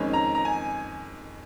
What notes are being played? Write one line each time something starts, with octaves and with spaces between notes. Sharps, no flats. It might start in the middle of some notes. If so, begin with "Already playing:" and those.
Already playing: F2 D#3 G#3 C#4
A#5
A#5
G#5